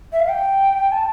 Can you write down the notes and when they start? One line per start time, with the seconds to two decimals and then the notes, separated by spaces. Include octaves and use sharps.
0.13 E5
0.20 F5
0.28 G5
0.92 A5